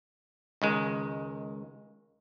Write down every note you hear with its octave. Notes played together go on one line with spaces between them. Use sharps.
C#2 D#3 G#3